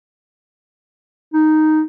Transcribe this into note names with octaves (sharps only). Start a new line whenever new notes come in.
D#4